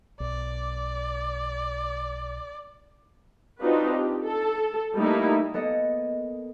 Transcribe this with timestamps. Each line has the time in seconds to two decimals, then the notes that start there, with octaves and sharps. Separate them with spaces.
0.20 B1 D5
3.62 C4 D4 D#4 F4 F#4 B4
3.94 G4
4.25 A4
4.96 G3 A3 A#3 D#4 E4
5.54 A#3 B3 A4 D#5 C#7